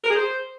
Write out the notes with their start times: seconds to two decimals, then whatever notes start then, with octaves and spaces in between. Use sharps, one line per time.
0.04 A#4
0.10 G#4
0.16 C5